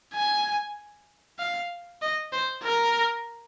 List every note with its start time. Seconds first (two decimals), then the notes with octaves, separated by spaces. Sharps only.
0.14 G#5
1.39 F5
2.02 D#5
2.32 C5
2.63 A#4